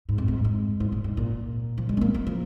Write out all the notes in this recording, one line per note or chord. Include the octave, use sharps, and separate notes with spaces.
G#2
F2
G#2
G#2
G#2
A#2
G#2
A#2
F3
G#3
C#4
A#3
A#3
F3